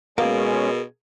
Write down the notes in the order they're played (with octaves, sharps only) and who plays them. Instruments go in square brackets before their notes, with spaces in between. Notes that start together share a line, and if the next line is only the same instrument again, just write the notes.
[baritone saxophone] B2 [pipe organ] G#3 C#4 [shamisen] A#3 [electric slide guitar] G#4 A#4